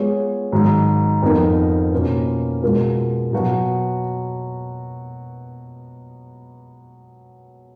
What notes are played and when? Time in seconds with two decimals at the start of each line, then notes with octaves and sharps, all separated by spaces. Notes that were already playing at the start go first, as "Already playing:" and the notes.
Already playing: G#3 B3 F4 G#4 C#5
0.52 G#2 D#3 F#3
1.22 F2 F3 B3 D#4 A#4
1.92 B2 A#3 C#4 F4 B4
2.62 B2 G#3 B3 F4 A#4
3.32 B2 F#3 B3 F#4